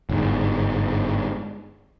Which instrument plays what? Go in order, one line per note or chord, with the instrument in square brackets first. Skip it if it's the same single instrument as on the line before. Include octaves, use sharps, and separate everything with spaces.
[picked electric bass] G1 G#2